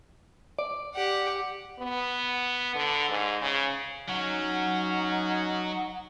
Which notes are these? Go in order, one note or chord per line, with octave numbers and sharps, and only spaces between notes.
D5
G4 F#5
B3
D3
G#2
C#3
F#3 C#4 D#4 F#5